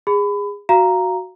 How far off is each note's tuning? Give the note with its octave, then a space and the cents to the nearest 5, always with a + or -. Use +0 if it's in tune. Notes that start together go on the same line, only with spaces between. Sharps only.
G#4 -25 B5 +25
F#4 +0 F5 -15 A#5 +0